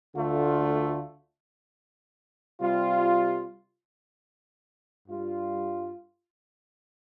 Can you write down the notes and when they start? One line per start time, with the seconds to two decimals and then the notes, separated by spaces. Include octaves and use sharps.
0.15 D2 D3 A3 F4
2.61 C3 G3 F4
5.07 G2 G3 F4